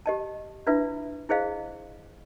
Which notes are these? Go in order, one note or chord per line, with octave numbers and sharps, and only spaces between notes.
G4 D#5 A5
D4 E4 F4 B4 E5
E4 G#4 C5 D#5 F5